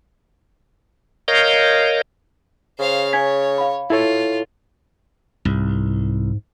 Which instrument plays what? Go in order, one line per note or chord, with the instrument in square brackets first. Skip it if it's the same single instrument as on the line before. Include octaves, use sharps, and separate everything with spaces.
[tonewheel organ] A#4 C#5 D#5 F5 G6
[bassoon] C#3 [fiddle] C5 F5
[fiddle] C#5 [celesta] G#5 G#6 B6
[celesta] F5 B5
[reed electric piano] E4 A4 C#5 [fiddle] F4
[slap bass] C2 [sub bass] G#2